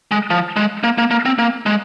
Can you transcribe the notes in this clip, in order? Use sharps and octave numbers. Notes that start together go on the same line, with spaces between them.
G#3
F3
G#3
A#3
A#3
A#3
C4
A#3
G#3